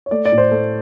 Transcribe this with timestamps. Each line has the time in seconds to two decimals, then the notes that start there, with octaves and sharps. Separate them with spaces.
0.06 C#5
0.11 A3 D5
0.25 D5
0.32 A2
0.38 C5
0.51 A3